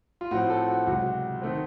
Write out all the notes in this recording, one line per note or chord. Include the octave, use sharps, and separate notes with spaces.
F4
A2 F3 C4 F#4
A4
F#4
C#2 C3 F#3 F#4
D#3 A3 C4